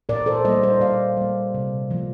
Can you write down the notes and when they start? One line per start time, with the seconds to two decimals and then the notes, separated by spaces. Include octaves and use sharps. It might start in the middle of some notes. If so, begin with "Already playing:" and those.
0.09 A#2 A#4 D5
0.26 A4 C5
0.45 G3 A#3 C5 D#5
0.63 C5 D#5
0.81 A#2 D5 F5
1.17 G3 A#3
1.54 C3
1.91 F3 A#3